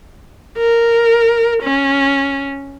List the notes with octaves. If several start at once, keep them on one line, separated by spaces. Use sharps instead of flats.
A#4
C#4